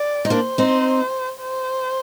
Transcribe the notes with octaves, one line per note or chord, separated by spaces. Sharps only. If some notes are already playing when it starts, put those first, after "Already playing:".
Already playing: D5
D#4
A#3 D4 C5
C4 D#4
C5